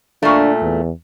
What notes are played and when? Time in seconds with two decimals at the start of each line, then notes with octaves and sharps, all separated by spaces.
0.23 A#2 A3 D4
0.61 E2